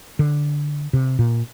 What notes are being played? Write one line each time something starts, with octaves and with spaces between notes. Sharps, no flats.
D3
C3
A#2